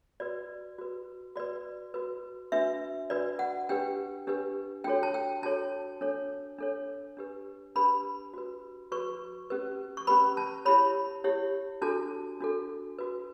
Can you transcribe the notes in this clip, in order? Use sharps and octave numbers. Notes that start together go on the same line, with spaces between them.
F#4 B4 D5
F#4 B4
F#4 B4 D5
F#4 B4
D4 F#4 B4 E5
D4 F#4 B4 D5
F#5
D4 G4 B4 G5
D4 G4 B4
D4 F#4 A4 C#5 G5
A5
G5
D4 F#4 A4 C#5 A5
D4 A4 C#5
D4 A4 C#5
D4 G4 B4
D4 G4 B4 B5
F#4 B4
F#4 B4 C#6
C#4 G4 B4
C#6
C#4 G4 B4 B5
A5
E4 G4 C#5 B5
E4 G4 C#5
D4 F#4 A4 A5
D4 F#4 A4
F#4 B4